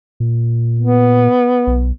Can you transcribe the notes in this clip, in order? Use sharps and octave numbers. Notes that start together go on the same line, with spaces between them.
A#2
B3
B1